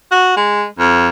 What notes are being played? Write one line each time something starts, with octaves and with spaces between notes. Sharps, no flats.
F#4
G#3
F2